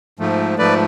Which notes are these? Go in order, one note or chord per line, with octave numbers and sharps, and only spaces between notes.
G#2 F3 A3
G#2 F3 A3 B4 D5